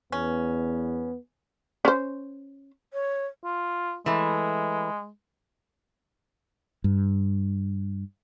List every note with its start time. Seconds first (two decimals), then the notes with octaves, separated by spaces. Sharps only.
0.12 E2 B3 C#4
1.85 C#4 C5
2.93 C#5
3.44 F4
4.06 E3 G#3 A3
6.84 G2